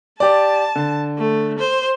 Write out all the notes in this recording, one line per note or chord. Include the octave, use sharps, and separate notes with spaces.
G4 D5 A5
D3
A3
C5